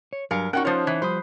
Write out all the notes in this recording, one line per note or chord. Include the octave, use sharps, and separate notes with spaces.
C#5
G2 F#3 A#4 F5 G#5 C#7
C#4 D#4 F#4 A#4 F#5 G5 F#6
F3 F4 C5 C#5
E3
F3 G3 C5 B5 D#6